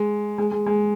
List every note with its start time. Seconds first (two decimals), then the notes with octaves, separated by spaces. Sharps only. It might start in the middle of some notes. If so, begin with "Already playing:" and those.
Already playing: G#3
0.38 G#3
0.51 G#3
0.66 G#3